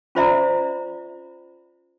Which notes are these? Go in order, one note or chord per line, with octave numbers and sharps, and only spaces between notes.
C#4 F4 C5 D5 E5 A#5